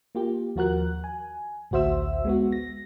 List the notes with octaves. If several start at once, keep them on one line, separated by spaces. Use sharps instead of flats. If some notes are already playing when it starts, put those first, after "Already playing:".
A#3 F4 G4
D#2 F3 F#4 A#4 F#6
G#5
A1 D2 F#4 C5 E5 E6
G#3 B3 F#4
A#6